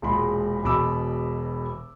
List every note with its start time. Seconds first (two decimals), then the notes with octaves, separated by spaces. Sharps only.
0.02 E1 A#2 G#3 B5 C6
0.64 E1 E2 B2 B5 D6 E6